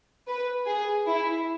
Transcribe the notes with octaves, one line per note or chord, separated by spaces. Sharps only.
B4
G#4
E4